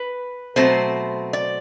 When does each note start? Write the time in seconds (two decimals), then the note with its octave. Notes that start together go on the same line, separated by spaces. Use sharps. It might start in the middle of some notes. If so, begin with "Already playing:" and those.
Already playing: B4
0.56 B2 F#3 A3 C4 C5
1.33 D5